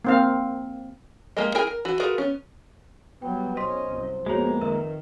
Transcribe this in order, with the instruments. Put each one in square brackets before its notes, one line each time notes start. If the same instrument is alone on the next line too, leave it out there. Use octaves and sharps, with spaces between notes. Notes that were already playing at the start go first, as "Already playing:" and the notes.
[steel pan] A#3 C4 F5
[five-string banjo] G#3 A#3 G4 A#4 D#5
E4 G#4 A#4 G5 G#5
A#4
E3 F#4
F4 F#4 G#4 A#4 B4
B3 C#4
[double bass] F#3 G3 [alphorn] B3 [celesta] G5
[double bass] B1 C#4 [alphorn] C5 [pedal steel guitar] D#5 [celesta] C6 B6
[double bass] C2 F#2
[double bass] F2 B3 [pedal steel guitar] G#3 A#3 A#5 [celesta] F#4 G#4 C#5
[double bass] D#3 [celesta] A#4 B4 E5